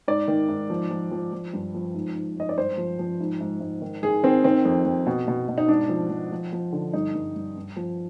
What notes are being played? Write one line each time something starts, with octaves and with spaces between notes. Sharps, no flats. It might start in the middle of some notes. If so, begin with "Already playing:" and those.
G#2 D5
D#3
G#2
F3
F3
F3
F3
G2
F3
G#2
G#2
G#2 D#5
D5
G2 C5
F3
F3
G#2
G#2
G#2
D#3
D#3 G#4
D#3 C4
D#3 C4
F2
F2
B2
B2
B2
D#4
G#2 D4
F3
F3
F3
F3
D3
G2 D#4
G2
G2
G2
F3